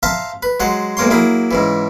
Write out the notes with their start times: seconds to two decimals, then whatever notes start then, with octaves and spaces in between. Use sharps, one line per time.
0.03 C5 E5 F5 A5 A#5
0.43 B4
0.60 F#3 G#3 C5 F#5
0.97 B1 G#3 A#3 C#5 C6
1.10 F#3 A#3 E4 G#4
1.51 G#2 C#3 E3